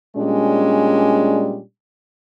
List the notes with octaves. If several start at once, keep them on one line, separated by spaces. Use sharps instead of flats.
A#2 G3 G#3 C#4 D4